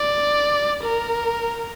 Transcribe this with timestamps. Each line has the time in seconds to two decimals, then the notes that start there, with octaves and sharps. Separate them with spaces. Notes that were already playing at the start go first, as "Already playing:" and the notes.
Already playing: D5
0.83 A#4